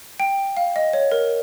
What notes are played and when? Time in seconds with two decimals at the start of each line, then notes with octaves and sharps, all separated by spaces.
0.20 G5
0.57 F5
0.76 D#5
0.93 C#5
1.12 A#4